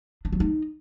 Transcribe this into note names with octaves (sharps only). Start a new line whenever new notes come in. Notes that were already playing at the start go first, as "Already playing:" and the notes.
D4
F#3
D#4